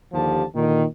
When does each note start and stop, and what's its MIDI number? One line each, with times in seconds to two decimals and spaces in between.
0.13 0.43 39
0.13 0.43 50
0.13 0.43 53
0.13 0.43 67
0.13 0.43 81
0.56 0.84 46
0.56 0.84 50
0.56 0.84 51